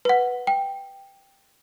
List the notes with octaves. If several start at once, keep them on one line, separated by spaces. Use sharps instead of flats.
B4 F#5
G5